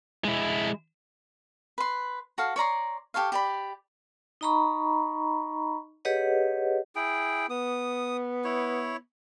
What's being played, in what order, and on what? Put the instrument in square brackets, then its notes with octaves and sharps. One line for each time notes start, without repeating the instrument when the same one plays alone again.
[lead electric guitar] G#3 E4
[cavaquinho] B4 C6
F#4 A4 F5
C#5 D5 A#5 C6
G4 A4 C#5 F5
G4 D5 B5
[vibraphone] D#4 D#5 A#5 B5 C#6
G4 G#4 B4 C#5 D#5 F#5
[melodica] E4 G#4 G5
[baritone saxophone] B3 [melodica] D#6
[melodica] E4 C#5